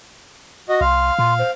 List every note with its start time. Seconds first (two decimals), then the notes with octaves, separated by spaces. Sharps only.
0.69 F#4 D#5
0.81 C2 F5 C6
1.19 A#2 C6
1.39 C5